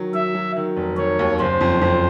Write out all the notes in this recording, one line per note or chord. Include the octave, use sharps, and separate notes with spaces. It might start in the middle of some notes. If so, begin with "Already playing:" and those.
Already playing: D#3 F#3
F#3 E5
F#3
D#3
F1
D#3 C#5
D#2
F#1 C5
F2
F2